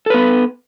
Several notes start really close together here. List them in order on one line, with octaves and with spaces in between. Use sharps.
A4 B4 B3